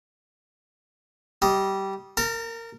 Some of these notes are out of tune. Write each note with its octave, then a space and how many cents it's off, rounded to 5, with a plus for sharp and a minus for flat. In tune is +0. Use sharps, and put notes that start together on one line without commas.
G3 -15 D#5 +0
A#4 -20 A5 +35